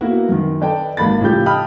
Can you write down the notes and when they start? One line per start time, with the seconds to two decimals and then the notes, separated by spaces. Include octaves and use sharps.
0.01 A#3 B3 E4 F#4 A#4
0.29 F#2 D#3
0.61 A4 B4 D5 D#5 G5 A5
0.97 G#1 A#3 B5 A6
1.21 A2 C#3 F3 G4 G6
1.46 D#5 G5 A5 B5 D#6 F6